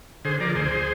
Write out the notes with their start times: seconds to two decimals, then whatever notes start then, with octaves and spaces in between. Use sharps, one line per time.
0.25 D3 G#4 C5
0.40 F3 A#4 D5
0.56 D2 G#4 C5